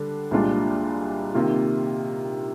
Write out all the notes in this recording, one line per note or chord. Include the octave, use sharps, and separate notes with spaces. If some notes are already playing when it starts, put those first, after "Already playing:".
Already playing: D3 G3 D4
C2 A#2 G#3 D4 F4
C3 D#3 A#3 F4